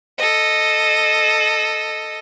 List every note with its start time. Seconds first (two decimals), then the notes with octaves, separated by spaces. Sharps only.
0.18 A4 D#5